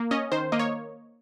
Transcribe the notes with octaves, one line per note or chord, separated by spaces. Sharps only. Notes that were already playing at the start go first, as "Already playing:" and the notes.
Already playing: A#3
C#4 D#5
D#3 C5
A#3 D#5
C#5